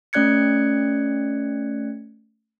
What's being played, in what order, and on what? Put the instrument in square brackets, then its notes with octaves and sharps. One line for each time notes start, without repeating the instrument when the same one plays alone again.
[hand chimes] A3 C#4 D5 F#6 G#6 C#7